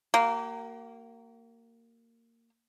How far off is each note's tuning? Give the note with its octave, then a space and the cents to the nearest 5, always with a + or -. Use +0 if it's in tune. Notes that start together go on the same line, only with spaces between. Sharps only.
A#3 -15 F#4 +45